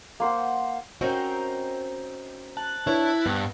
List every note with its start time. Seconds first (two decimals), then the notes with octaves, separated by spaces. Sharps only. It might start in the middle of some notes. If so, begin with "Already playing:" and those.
0.20 A#3 C5 F#5
1.01 C4 C#4 D#4 F#4 A#4
2.57 A5 F#6
2.87 D4 E4 B4 C#5
3.26 G2 B3